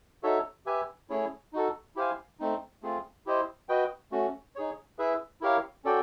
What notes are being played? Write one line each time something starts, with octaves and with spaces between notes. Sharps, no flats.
D#4 F#4 A4 C#5 E5
G4 B4 E5 G#5
A3 C#4 E4 G#4 C#5
D#4 F#4 A4
E4 G4 C5 F5 G#5
A3 C4 D#4
A3 C4 F4 G#4
E4 G4 C5 D#5
F#4 B4 D#5 G5
A3 C#4 F#4
D#4 G#4 C#5
E4 G#4 B4 E5
E4 G4 A#4 C#5 F5
C#4 F#4 A4 D5 G5